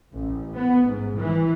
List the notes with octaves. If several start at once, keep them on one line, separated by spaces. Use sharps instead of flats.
A1
B3
G#2
E3